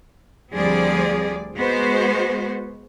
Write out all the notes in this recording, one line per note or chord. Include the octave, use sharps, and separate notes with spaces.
D2 F3 G3 C4 G#4 D5
G#3 B3 F#4 C5